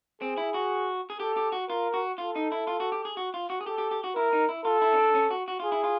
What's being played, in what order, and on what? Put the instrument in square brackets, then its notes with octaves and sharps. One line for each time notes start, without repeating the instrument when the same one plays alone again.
[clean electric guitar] C4 [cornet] G#4
[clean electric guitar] E4
F#4
G#4
[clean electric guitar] G4 [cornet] A4
[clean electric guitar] G4
F#4
[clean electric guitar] F4 [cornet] A#4
[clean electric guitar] F#4
[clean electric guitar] F4 [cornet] A4
[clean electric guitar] D#4
E4
F4
F#4
G4
G#4
F#4
F4
F#4
G#4
[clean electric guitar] G4 [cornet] A4
[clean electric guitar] G4
G4
F#4
[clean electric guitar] E4 [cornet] A#4
[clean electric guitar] D#4
E4
[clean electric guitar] F4 [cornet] A4
[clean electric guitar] E4
C#4
D4
C#4
F#4
F#4
[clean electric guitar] F4 [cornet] G#4
[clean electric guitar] E4
F4